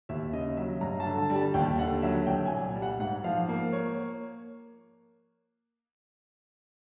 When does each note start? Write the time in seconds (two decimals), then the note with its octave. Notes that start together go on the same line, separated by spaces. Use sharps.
0.09 D#2 E5
0.33 C#3 D#5
0.57 F#3 E5
0.81 G2 A#5
1.00 A5
1.06 D3
1.18 A5
1.30 G3
1.36 A5
1.54 D#2 G5
1.79 D3 F#5
2.02 F#3 E5
2.27 C2 G5
2.46 G#5
2.52 A#2
2.76 G3
2.82 F#5
2.99 G#2 F#5
3.24 F3 F5
3.49 A#3
3.73 C#5